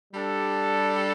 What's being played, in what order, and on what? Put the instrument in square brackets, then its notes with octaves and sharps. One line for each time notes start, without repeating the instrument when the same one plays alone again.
[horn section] G3 D4 A4